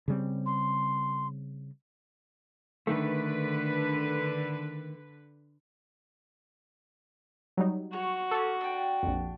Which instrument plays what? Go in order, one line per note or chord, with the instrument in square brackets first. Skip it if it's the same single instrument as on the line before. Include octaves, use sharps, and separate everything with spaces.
[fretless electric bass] C#3 G3 C4
[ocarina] C6
[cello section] D3 B4 [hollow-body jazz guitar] D#3 A3
[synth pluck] F#3 G3 D#4
[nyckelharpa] F#4 [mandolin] C#5
[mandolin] C#4 D6 [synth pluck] A4
[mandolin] D4 G5
[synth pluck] A#1 F2